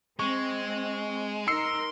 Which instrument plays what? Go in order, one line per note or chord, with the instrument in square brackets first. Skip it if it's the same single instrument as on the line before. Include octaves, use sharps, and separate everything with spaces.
[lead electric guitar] G#3 [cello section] C4 [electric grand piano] C#6
[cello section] D#4 A#4 [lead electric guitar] C6 [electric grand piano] E6 C7 C#7